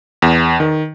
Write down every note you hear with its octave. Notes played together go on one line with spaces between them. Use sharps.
E2
D#3